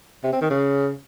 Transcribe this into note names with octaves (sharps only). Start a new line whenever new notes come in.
C3
C4
D#3
C#3